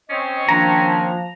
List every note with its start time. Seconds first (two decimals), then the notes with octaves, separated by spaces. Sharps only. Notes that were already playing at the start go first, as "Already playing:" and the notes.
0.10 C4 C#4 C#5 D#5
0.49 D#3 F3 A#3 D4 A#5